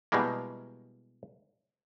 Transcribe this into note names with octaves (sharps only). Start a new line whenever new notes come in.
B2 E3 G3 G#3 A#3